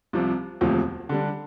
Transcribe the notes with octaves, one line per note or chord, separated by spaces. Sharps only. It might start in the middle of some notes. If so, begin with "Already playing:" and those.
C2 C3 F3
E1 D2 C3 F3
D3 G3 D4